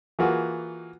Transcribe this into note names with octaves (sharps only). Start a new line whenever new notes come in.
E3 A#3 F4 F#4 G#4